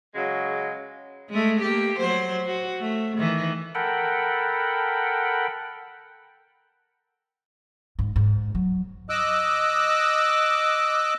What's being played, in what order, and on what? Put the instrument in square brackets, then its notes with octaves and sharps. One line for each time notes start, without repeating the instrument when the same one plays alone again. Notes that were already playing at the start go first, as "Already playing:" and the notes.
[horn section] C#3 F#3 G#3
[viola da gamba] G#3 A3
A#3 G4
F#3 C5
F#4
A3
D#3 E3
[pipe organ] A4 A#4 F#5 G5 B5
[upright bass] G#2
G#2
F#3
[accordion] D#5 D6 E6 F#6